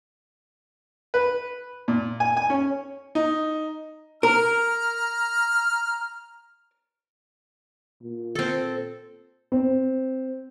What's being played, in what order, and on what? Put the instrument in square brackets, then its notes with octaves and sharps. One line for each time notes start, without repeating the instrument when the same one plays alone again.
[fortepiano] B4
A#2
G#5
G#5
C#4
[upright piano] D#4
[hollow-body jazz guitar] A#4 [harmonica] A#5 F6
[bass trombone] A#2
[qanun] C4 A4
[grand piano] C4